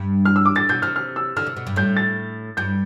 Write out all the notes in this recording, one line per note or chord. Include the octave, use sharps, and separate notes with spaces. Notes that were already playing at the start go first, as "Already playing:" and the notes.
Already playing: G2
F6
E6
D6
A2 A6
B2 G6
C3 F6
F6
E6
D3 F6
C3
B2
G2
A2 G6
A6
G2 G6